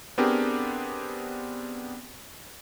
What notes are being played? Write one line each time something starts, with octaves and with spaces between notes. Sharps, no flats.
B3 C4 D4 G4 G#4 A#4